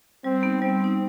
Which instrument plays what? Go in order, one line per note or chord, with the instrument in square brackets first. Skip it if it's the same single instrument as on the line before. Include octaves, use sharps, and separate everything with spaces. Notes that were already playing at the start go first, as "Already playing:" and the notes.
[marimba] G3 [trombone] C4
[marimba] B3 D#4
[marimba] G3 [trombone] C4
[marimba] B3 D#4